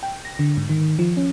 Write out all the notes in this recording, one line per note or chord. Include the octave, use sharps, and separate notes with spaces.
G5
A#6
D3
G#2
D#3
F3
C#4